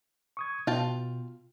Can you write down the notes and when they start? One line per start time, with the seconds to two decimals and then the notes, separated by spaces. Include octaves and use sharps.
0.37 C#6 D#6 G#6
0.67 B2 F4 G5 A5